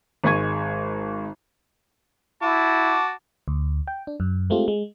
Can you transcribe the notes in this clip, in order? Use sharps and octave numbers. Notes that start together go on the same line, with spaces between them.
G#1 G#3 C#6 G#6 D#7
E4 F#4 A5 D6
D2
G5
D4
F#2
G#3 A3 C4 F4 G4
G#3